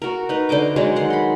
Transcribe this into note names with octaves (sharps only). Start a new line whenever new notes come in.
F#4 A#4
D#4 B4
D3 C5 D#5 D6
D3 F#3 G#3
D#3 F#5 C6
B5 C6